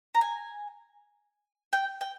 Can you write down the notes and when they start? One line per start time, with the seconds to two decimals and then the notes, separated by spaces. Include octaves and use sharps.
0.15 A#5
0.21 G#5
1.73 G5
2.01 G5